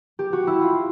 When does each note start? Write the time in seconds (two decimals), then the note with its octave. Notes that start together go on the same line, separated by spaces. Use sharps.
0.19 G4
0.33 F#4
0.47 E4
0.61 F4